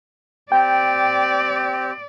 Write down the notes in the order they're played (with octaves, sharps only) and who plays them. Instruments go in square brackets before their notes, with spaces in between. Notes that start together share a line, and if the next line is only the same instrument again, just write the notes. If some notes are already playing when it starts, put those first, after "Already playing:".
[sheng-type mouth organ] C4 G4 [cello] D5 [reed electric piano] G5